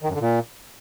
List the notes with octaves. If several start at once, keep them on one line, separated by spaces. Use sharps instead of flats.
D#3
F#2
D3
A#2